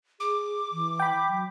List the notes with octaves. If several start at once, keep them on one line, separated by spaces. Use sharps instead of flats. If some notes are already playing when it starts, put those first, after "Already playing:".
G#4 D6
E3
G5 B5
F#3